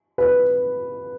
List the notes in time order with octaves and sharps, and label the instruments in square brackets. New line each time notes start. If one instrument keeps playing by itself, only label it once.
[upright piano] B4